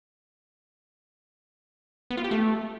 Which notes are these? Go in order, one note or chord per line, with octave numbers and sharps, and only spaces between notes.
B3
F4
G4
A3